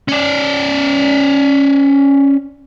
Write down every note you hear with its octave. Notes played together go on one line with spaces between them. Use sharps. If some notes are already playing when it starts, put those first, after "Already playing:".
C#4 D5